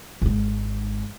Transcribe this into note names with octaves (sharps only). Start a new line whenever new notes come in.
G#1 G#2